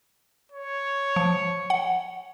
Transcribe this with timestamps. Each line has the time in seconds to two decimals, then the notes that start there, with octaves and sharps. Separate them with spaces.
0.52 C#5
1.16 F3
1.70 F#5